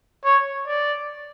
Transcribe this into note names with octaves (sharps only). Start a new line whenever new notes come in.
C#5
D5